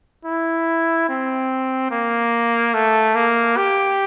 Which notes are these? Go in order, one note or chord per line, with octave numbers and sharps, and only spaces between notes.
E4
C4
A#3
A3
A#3
G4